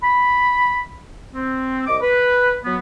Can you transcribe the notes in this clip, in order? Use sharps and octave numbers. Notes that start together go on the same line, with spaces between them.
B5
C4
C2 D#5 D6
B4
F#3 B3